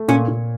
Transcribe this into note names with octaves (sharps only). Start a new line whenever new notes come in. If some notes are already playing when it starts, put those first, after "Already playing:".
Already playing: A3
A#2 C#4
A#2